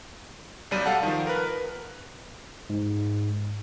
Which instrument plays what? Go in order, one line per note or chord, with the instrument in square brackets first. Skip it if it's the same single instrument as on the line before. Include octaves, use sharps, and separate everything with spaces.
[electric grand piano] B1 F#2 G3 D#7
A4 F5 F#5 A5
D#3 F3
A#4 B4
[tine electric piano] G#2